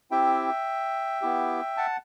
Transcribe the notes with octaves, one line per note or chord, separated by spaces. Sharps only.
C4 E4 G4 E5 G5
B3 E4 G4
F#5 A5